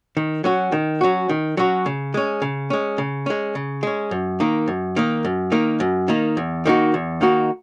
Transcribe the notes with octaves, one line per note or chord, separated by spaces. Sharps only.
D#3
F#3 C#4 F#4
D#3
F#3 C#4 F#4
D#3
F#3 C#4 F#4
C#3
G#3 C#4
C#3
G#3 C#4
C#3
G#3 C#4
C#3
G#3 C#4
F#2
D#3 A#3 D#4
F#2
D#3 A#3 D#4
F#2
D#3 A#3 D#4
F#2
D#3 A#3 D#4
E2
D#3 A#3 D#4 F#4
E2
D#3 A#3 D#4 F#4